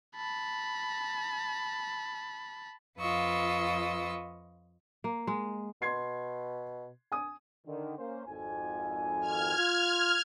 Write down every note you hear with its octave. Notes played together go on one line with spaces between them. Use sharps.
A5 B5
F2 F4 B4 D#5 C#6 E6
A#3
G#3
B2 C6 G#6 C7
G#5 D#6
D3 D#3
A#3 C#4 C5
G#1 F2 G#5
F6 G#6
F4